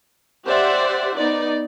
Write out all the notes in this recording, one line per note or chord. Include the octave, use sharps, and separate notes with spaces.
G4 C5 D5 E5 F#5
B3 D#4 D5